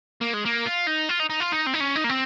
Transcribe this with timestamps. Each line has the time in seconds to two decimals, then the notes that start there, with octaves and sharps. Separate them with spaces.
0.21 A#3
0.34 G#3
0.45 A#3
0.65 F4
0.87 D#4
1.09 F4
1.20 D#4
1.30 D#4
1.40 F4
1.52 D#4
1.66 C4
1.74 D#4
1.80 C#4
1.96 D#4
2.04 A#3
2.09 C4